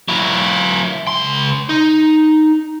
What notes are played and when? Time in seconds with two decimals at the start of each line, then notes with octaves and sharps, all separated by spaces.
0.08 F#3 E4
1.07 C#2 C6
1.69 D#4